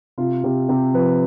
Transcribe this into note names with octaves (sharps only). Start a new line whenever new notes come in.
C3 F4
C3 G4
C3 G4
F3 B4